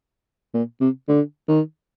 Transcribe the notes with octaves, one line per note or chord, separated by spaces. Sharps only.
A#2
C3
D3
D#3